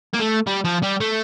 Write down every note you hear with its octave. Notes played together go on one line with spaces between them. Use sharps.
A#3
A3
G3
F3
G3
A3